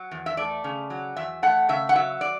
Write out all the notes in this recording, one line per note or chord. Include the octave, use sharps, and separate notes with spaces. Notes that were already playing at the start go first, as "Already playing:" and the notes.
Already playing: F#3
E2
E5
A3 D5
C#3
F#3
E2 E5
A3 F#5
C#3 E5
F#5
F#3 E5
D5